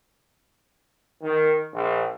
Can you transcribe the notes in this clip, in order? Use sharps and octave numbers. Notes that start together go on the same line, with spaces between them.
D#3
A#1